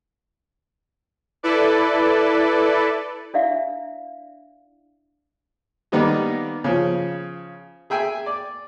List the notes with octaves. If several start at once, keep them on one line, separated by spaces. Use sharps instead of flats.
E4 A4 B4 D5
D4 E4 D5 E5 F5
D#3 G3 A#3 B3 D#4 G4
C#3 F3
G#4 E5 G5 G#5
D5